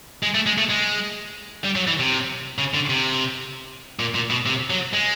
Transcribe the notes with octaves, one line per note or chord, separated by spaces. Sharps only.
G#3
A3
G#3
A3
G#3
G3
F#3
E3
C3
C#3
D3
C3
A#2
A#2
B2
C3
F#3
G#3